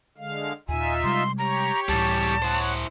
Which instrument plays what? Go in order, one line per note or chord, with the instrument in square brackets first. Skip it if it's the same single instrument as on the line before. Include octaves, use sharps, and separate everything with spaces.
[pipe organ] D3 G#3 F5
[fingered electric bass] D#2 A#2 [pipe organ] D#4 F4 E5 [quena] G#5
[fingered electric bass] C3 G3 G#3 [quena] C6
[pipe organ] G4 C#5 [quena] A#5
[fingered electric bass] C#2 A2 [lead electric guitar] E3 G3 [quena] A5
[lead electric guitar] E4 C5 [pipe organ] C#5 F#5